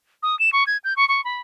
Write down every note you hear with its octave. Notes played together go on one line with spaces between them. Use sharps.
D#6
E7
C#6
G#6
G6
C#6
C#6
B5